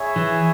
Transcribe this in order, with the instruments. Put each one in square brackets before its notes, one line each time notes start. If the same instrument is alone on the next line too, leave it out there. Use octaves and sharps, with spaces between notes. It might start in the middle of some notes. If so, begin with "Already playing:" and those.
Already playing: [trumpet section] E4 G#4 C#5 E5
[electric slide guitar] E3